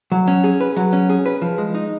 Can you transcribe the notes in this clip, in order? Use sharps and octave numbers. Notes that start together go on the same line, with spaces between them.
F#3
C#4
G#4
B4
F#3
C#4
G#4
B4
F3
G#3
D#4